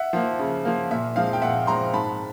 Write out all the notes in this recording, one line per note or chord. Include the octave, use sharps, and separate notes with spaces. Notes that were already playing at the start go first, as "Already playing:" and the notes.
Already playing: E5 F#5
F3 A#3
C#3
F3 A#3
A#2 E5
F3 G#3 C4 F5
G5
A#2 E5 F#5
F3 G#3 C4 A#5 C6
G#2 A5 B5